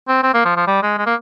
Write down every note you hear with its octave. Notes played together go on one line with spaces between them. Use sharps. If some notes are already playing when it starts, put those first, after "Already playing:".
C4
C4
A#3
F3
F3
G3
G#3
G#3
A#3